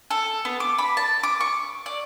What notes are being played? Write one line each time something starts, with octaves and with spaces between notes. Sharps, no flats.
A4
B3
D6
B5
A5
D6
C#6
D5